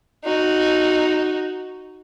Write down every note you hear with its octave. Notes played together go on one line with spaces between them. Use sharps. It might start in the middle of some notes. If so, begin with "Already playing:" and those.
D#4 F#4